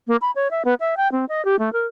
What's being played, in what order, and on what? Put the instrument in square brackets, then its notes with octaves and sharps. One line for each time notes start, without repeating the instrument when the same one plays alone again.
[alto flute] A#3
B5
C#5
E5
B3
E5
G5
C4
D#5
G4
A3
A#4